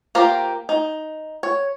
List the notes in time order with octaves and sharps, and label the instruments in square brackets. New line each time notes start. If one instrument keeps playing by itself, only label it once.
[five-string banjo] A#3 F4 G4 A#4 C5
D#4
C#5